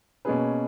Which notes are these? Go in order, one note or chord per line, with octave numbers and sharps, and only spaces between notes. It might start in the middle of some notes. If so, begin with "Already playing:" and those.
B2 A#3 C#4 G#4 B4